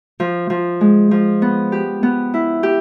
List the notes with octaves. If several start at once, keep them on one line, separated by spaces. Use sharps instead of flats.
F3
F3
G#3
F3
B3
G4
B3
E4
G4